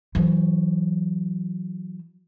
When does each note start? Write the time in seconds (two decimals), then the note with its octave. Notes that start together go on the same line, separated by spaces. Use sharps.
0.15 E3 F#3